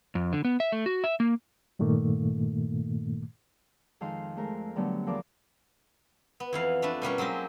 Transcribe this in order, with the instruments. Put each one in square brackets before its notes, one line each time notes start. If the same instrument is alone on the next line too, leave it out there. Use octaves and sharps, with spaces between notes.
[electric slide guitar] F2
D3
B3
E5
A3
F#4
E5
A#3
[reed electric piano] G2 A#2 D#3 A3 A#3
[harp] F2 D#3 G#3 F5 C6
G#3 A3 A#4 C5
D3 F#3 G3 A3 B3
E2 F3 A#4 A5 D6
[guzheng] B3
F2 E3 F5
A3 D4 B4
B2 G3 A#3 C#4
F#3 G#3 C4 G4